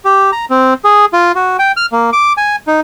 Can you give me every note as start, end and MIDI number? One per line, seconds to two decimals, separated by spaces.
0.05 0.31 67
0.32 0.45 82
0.50 0.74 60
0.85 1.05 68
1.13 1.32 65
1.35 1.57 66
1.59 1.72 79
1.77 1.86 89
1.92 2.10 58
2.13 2.33 86
2.37 2.56 80
2.67 2.80 63